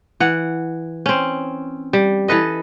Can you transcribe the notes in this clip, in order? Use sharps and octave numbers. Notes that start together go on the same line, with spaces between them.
E3 F#5
C4 C#4
G3
E3 A4 B4 D#5